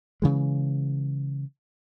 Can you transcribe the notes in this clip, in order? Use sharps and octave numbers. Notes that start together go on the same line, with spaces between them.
C#3 E3 G#3